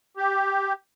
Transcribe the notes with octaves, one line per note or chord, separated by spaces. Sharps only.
G4